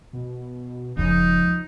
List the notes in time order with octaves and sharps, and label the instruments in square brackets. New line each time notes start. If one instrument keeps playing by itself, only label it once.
[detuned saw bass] B2
[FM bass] F1 [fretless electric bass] C#2 C#3 [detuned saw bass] F3 [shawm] D#4